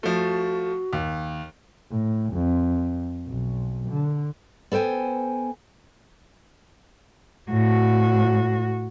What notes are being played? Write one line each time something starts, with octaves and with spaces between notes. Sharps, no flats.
F3 A3 F#4
D#2
A2
F2
B1
D3
B3 A4 C5 G5 G#5
A2 F#4